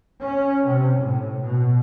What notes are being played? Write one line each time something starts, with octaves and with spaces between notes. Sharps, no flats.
C#4
C3
A2
B2